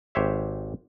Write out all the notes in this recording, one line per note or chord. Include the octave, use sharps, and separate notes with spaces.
G#1 G4 C5 C#5 E5